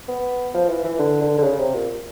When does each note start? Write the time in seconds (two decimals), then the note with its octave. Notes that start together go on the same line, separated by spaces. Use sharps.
0.08 B3
0.54 F3
0.69 E3
0.84 E3
0.99 D3
1.21 D3
1.38 D3
1.44 C#3
1.59 C3
1.74 A#2